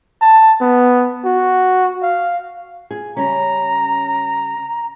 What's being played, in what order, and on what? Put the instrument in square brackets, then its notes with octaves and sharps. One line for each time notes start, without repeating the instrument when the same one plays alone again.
[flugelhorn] A5
B3
F#4
F5
[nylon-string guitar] G#4
[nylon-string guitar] C#3 G3 C#4 [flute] A#5